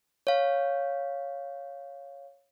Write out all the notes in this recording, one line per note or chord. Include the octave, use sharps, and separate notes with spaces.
C#5 F5